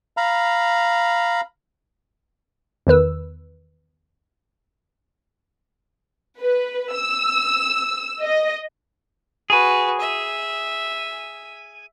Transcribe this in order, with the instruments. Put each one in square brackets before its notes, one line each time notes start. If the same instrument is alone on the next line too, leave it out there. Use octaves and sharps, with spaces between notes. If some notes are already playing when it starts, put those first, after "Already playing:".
[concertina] F5 A#5 B5
[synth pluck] E2 D#3 B4 E6
[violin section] B4
E6
D#5
[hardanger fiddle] F#4 B4 [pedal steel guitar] G#4 G#5
[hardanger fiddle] E5